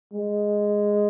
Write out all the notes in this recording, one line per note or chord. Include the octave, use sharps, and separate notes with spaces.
G#3